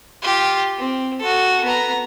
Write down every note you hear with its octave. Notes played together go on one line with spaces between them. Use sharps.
F4 G4
C4
F#4 A4
B3 A#5